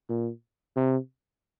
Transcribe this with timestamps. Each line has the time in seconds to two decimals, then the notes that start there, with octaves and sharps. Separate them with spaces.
0.10 A#2
0.76 C3